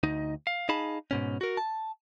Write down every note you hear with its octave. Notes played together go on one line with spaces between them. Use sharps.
D2 D#4 D#5
F5
D#4 G#4 F5 A5 B5
G#2 B2 C#4
F#4 A#4
A5